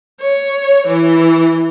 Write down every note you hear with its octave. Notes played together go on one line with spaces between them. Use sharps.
C#5
E3